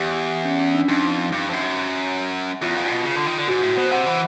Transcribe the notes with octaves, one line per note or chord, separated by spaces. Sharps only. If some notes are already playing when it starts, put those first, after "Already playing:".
Already playing: E2 G4
C#4
C#4
D4
F2 D#4
G2
F2
F#2
E2 F4
F2
B2
C#3
D3
D#3
D3
G#2 F#4
A2
B2 C5
C3 F#5
E3